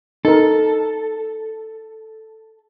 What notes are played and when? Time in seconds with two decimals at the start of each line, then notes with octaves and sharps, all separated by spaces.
0.25 D#4 A4 A#4